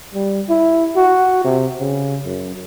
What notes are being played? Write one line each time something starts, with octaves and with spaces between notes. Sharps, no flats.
G3
E4
F#4
C3
C#3
F#2